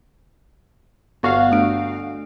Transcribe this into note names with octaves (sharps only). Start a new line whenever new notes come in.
G1 B3 F#4 F5
A3 D4 D7